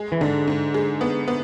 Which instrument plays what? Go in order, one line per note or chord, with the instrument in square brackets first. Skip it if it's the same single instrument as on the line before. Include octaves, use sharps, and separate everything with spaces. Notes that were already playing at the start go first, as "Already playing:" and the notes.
Already playing: [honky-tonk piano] G#3
[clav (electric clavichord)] E3
[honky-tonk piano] G#2 [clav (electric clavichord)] D3
[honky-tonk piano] G#2
G#3
B3
B3